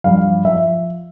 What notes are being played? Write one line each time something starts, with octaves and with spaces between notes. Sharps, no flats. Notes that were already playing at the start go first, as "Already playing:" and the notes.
G2 F3 F5
F3 E5